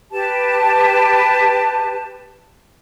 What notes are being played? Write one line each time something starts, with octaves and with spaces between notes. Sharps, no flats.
G4 B4 A5